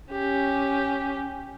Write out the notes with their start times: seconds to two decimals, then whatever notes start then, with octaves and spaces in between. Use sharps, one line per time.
0.11 C#4 G4